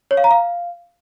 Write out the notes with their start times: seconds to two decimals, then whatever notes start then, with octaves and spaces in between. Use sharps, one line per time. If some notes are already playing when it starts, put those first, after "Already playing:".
0.11 C#5
0.17 F5
0.24 A#5
0.31 F5